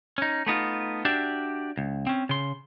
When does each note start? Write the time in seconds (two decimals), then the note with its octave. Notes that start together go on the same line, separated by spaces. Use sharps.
0.18 C#4 D#4
0.46 A3 B3 D#4 F4
1.05 D4 F#4 G4 D5 E5
1.77 C#2
2.07 C4 C#4
2.29 C#3 C6